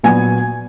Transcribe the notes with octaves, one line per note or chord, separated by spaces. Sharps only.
A#2 F#3 B3 G#5